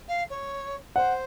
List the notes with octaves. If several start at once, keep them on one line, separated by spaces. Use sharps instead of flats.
F5
C#5
C5 F#5